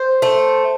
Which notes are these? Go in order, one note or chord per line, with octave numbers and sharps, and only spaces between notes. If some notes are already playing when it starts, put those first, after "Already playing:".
Already playing: C5
A3